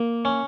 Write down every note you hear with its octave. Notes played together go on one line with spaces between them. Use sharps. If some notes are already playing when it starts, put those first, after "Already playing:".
Already playing: A#3
C#4